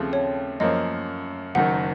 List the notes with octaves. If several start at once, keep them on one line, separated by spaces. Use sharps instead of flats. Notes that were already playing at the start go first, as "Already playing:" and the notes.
Already playing: D#2 C#3 F3 A3 C4
C#5
F#2 F3 A#3 C#4 D#5
F#1 F#2 D#3 F#5